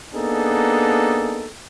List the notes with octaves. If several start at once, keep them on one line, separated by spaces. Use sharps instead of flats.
A#3 B3 D4 D#4 G#4 A4